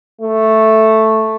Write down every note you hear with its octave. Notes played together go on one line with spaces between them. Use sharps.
A3